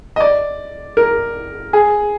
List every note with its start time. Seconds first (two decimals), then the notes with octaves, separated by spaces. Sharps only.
0.16 D#5
0.20 D5
0.97 A#4
1.73 G#4